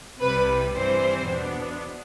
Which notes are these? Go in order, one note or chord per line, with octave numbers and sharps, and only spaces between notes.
C2 C3 G3 B4
G2 E3 G3 C4 C5
E2 B2 B3 D4